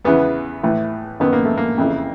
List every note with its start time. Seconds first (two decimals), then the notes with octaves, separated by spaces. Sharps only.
0.05 E2 C#3 E3 B3
0.63 A2 E3
1.20 F#2 D#3 B3
1.33 A#3
1.45 A3
1.57 A#3
1.78 F2 C#3 E3